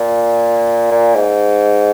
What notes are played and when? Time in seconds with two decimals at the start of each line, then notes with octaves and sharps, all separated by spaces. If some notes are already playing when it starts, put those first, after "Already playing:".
Already playing: A#2
0.91 A#2
1.15 G#2